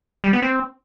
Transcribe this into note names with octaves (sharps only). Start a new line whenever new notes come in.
G3
B3
C4